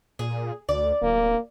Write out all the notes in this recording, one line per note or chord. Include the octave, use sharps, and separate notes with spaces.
A#2 G#4
D2 D5
D1 A#3